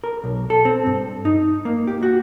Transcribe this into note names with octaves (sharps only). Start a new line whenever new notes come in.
A#4
B1
A4
C4
G2
D#4
A#3
G4
F#4